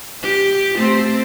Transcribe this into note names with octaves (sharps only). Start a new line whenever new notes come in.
G4
A3 C4